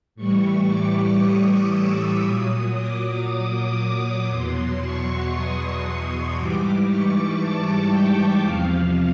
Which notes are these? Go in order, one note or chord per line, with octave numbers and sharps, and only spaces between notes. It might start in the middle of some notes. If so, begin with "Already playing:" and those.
A2 E3 G3 C#6
D6
D#6
E6
A#2 F#3 D#6
D6
E2 B2 F#3 C6
C#6
D#6
G#2 E3 G3 D6
C#6
A5
G5
E2 C3 F3 F5